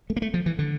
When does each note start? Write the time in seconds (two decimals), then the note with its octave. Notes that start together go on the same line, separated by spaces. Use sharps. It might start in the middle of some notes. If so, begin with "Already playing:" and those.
0.10 A3
0.16 A#3
0.22 A3
0.34 F3
0.46 E3
0.59 D3